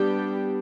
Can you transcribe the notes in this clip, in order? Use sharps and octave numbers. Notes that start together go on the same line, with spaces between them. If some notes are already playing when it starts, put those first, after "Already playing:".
Already playing: G3 B3 D4 G4